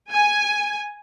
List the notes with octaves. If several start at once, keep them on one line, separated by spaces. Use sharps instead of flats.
G#5